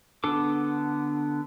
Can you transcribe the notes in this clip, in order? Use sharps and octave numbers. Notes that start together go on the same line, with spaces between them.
D3 B3 D4 A4 D6